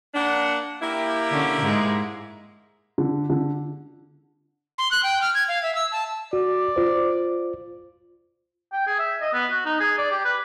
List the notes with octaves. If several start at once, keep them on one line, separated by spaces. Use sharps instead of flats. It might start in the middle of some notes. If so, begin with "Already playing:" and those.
A#3 D4 F#5
A#3 E4 G4
D3 C#4
G#2 G#3
D3
D3
C6
F#6
G5
F6
G#6
F5
E5
E6
A5
F#4 D5
F4 C5
G5
G#4
E5
D#5
B3
F#4
D#4
G#4
D5
G4
B4